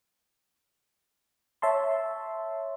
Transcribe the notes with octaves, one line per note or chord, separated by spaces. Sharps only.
C#5 E5 A5 C6